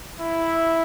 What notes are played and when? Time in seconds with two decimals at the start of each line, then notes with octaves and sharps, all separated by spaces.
0.20 E4